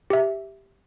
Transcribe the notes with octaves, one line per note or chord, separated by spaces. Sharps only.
G4 E5